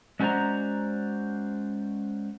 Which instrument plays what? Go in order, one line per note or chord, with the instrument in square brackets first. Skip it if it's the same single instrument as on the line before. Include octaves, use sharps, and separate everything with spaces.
[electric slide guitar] G#3 C#4 F#4 C5 D5 A#5